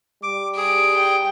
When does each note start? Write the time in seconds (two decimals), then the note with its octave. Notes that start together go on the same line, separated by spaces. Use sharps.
0.23 G3 D6
0.57 G#4 D7
0.96 G5